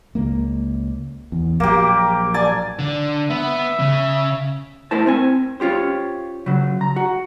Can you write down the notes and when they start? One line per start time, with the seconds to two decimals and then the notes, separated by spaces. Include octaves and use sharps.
0.15 C#2 A#3
1.32 E2
1.60 A#1 F#3 A#3 G4
2.34 D5 G#5 A5
2.79 D3
3.30 B3 E5
3.79 C#3
4.91 A3 E4 A#4 C5 A5
5.07 C4 G#5
5.60 C#4 F4 G4 C5
6.46 C#3 F#3
6.81 A#5
6.96 F#4